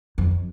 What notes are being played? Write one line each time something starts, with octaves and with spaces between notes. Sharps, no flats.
F2